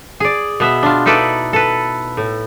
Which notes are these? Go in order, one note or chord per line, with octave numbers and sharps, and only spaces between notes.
G#4 D5
B2 B3 E5
D4 F4
D#4 E4 A4 B4 D5
A4 B4
A2